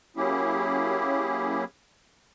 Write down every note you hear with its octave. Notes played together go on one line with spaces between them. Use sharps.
F#3 A#3 C#4 E4 G4 G#4